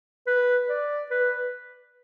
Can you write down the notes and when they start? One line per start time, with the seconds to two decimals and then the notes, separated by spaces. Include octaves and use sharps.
0.27 B4
0.69 D5
1.11 B4